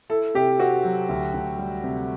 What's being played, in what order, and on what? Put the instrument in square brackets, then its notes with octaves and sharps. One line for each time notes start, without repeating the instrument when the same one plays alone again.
[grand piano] E4 [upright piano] A4
[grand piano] C3 [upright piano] G4
[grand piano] C4 [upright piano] F#4
[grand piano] F#3
D2
D2
G3
C3